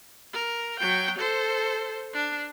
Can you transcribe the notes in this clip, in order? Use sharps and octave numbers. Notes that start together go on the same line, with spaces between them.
A#4
F#3 G5
A4 C5
D4